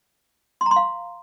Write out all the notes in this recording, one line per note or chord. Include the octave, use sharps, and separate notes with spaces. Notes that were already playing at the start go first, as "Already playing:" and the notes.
C6
A#5
C6
F5